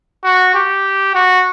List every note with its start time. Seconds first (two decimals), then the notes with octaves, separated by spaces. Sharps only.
0.24 F#4
0.55 G4
1.15 F#4